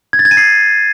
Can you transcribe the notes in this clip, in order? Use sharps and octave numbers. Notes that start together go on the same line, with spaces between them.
G#6
A6
G#6
D#7
C7